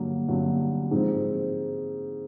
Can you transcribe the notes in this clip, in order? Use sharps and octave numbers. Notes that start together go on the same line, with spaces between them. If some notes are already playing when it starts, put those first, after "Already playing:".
Already playing: G2 D3 F#3 A#3
G2 D3 F#3 A#3
G#2 F3 G#3 C4